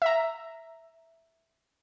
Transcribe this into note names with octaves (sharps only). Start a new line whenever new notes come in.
E5 A#5